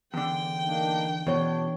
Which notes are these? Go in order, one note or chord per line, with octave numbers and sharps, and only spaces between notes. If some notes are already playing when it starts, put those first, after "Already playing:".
E2 D3 G5
A#3 D4 D#4
B2 E3 D4 C#5